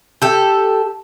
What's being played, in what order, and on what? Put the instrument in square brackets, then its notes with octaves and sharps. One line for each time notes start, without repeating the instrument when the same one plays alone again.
[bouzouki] G4 A4